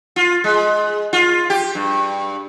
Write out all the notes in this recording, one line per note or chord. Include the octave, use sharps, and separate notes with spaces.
F4
G#3
F4
G4
G2